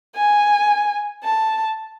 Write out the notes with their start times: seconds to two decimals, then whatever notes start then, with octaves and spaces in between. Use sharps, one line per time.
0.16 G#5
1.24 A5